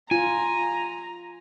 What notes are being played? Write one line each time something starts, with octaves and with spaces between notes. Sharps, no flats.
F4 G#5 A#5